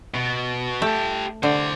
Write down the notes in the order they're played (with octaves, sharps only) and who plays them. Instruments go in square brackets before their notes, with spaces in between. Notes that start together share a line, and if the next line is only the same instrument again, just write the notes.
[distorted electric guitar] B2
[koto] A3 [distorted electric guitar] G4 A4
[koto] D3 [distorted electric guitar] C5 D5